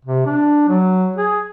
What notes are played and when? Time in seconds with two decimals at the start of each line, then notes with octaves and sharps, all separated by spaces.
0.05 C3
0.26 D4
0.69 F#3
1.16 G#4